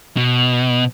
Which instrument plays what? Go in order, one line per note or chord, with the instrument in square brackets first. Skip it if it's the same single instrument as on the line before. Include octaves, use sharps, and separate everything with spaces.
[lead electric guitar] B2